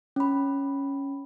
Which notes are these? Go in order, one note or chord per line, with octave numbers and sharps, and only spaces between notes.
C#4 B5